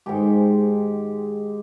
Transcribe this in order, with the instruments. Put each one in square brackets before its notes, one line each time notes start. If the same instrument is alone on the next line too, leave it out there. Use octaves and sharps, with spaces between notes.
[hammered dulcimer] G#2 D#3 G#3 G4